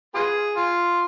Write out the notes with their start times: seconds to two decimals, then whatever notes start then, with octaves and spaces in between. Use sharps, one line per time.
0.15 B3 F4 G#4
0.56 F4